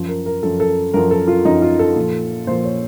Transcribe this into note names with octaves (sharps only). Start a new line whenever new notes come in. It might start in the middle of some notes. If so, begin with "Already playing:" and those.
Already playing: F#2 F3
A#4
A#4
F#2 F3 A4
A4
F#2 F3 A#4
A4
F4
F#2 F3 D#4
F4
A4
A#2 F3
A#2 F3 C5
C#5